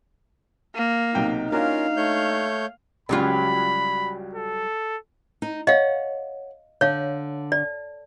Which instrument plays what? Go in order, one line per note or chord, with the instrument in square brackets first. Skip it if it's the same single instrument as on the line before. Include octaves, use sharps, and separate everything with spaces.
[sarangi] A#3
[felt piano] B1 C3 G5 [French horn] D#4
[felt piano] A#3 D4 F#4 [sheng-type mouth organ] C#4 F4 A#4 [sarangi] F5
[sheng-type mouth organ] A3 C#5 G6
[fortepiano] C#2 C#3 [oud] F#3 G3 F4 [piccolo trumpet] B5
[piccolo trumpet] A4
[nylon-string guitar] D#4
[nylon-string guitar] C#5 F#5 [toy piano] D#5 F5
[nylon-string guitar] D3 [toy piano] C#5 F5
[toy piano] D5